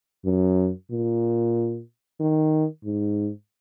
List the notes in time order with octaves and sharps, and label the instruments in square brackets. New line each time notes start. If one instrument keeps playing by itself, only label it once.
[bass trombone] F#2
A#2
D#3
G#2